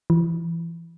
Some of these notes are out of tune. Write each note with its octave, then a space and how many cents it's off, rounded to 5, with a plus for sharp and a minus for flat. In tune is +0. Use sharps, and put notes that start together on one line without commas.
E3 +25